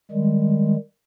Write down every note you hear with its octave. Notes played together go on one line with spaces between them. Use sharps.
D#3 G3 G#3